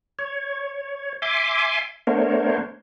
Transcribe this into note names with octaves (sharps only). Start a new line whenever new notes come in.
C#5
E5 G#5 C6 D6
A3 B3 D4 A#4 C5 C#5